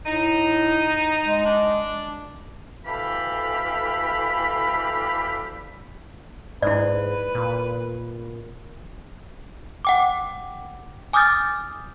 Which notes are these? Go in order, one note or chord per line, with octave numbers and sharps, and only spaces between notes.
A2 D#4
G#3
D4
D2 E3 G4 A4 F5 B5
G#2 E4 B4 D5
A#2
F#5 G5 D6
G#5 D6 D#6 F6 G6 A6